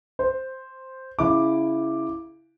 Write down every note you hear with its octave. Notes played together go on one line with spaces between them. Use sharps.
C5
C#3 E4 D6